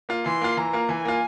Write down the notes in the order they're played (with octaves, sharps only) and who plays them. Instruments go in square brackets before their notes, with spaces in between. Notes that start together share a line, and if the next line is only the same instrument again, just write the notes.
[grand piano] A#3 F4
[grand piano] E3 [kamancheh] C6
[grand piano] A#3 F4
[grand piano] E3 [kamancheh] A#5
[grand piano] A#3 F4
[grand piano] E3 [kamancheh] G#5
[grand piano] A#3 F4